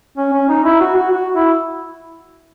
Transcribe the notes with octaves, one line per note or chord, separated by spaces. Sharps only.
C#4
C#4
D#4
E4
F#4
F#4
F#4
E4